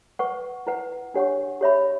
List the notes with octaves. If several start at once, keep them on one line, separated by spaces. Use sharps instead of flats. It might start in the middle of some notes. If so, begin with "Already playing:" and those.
B4 F#5 C#6
E4 B4 F#5
D4 G4 C#5 F#5 C#6
G4 C#5 E5 B5